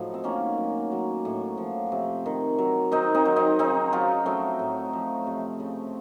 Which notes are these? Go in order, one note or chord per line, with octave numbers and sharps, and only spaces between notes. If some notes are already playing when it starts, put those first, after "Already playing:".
Already playing: A2 F3 F#3 D#4
C4
D#3 A#3 C#4
F#3
F#3
A2
F3
C3
D#3
F#3
D#3 C4 D#4
C4 D#4
F#3
C4 D#4
C#3 C4 D#4
F#3 C#4 F4
F#3 A3 C4
A2
F3
C3
C#3